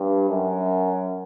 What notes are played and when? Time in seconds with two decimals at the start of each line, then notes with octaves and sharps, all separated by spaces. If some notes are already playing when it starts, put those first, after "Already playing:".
Already playing: G2
0.29 F#2